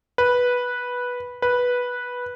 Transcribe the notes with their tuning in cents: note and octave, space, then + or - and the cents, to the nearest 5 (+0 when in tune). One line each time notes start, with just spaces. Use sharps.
B4 -10
B4 -10